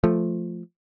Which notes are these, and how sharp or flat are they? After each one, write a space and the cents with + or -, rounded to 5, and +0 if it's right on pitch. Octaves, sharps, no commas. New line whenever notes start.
F3 +0 A3 +0